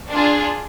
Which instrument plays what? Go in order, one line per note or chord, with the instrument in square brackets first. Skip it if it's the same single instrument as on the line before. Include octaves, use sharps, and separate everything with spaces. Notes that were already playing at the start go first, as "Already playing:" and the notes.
[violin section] D4 F4 G#4